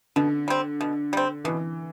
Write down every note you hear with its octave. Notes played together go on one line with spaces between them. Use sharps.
B2 D3
G3 C4
B2
G3 C4
B2 E3